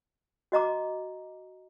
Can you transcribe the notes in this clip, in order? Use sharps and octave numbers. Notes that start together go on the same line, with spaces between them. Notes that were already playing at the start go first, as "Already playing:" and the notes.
F#4 D#5 A#5 D6